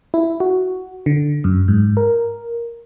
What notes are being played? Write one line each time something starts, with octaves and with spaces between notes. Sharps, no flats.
E4
F#4
D3
F#2
G#2
A#4